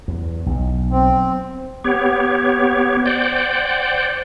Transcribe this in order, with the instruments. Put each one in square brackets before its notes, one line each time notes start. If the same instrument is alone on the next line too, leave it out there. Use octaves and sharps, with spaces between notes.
[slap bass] E2
B1
[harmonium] C4
[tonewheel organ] B3 G4 C#5
C5 D5 F#5 G5